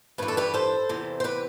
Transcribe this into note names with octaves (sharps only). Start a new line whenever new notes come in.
G2 E3 B4
A4
G4 B4
A4 C5
E2 C3 E3
C5
G4 B4